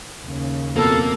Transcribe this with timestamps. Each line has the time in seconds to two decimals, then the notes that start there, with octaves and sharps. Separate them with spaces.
0.23 D#2 C#3
0.76 F2 B2 A#3 A4